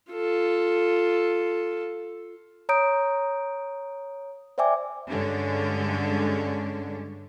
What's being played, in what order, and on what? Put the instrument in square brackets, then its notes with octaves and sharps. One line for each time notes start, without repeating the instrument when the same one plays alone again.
[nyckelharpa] F4 A4
[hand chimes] C#5 A#5 D#6 G6 D7
C5 D5 E5 G5 G#5 D6
[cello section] G2 D3 G#3 C#4 D4